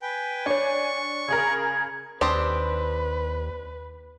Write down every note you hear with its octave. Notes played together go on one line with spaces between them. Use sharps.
B4 G5 G#5
D4 C#5 D5 C#6
C#3 G#4 A#4 G#6
D#2 C4 D4 G4 B4 A5 C6 D#6